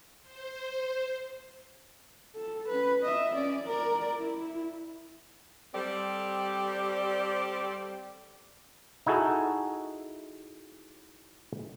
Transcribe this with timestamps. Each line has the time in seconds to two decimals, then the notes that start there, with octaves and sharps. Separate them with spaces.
0.22 C5
2.36 A4
2.68 C#4 B4
3.03 D#5 E5
3.36 C#4 D5
3.67 A#4 D5
4.18 E4
5.74 G3 C4 G4 A4 D5
9.06 D#4 E4 F#4 G#4 A4